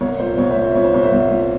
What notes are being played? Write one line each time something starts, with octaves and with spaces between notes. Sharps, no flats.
C2 C#5
A#2 C5
C2 C#5
C5 E5
A#2
C5
A#2 C#5
C5
C2 C#5
C5 E5
C2
A#2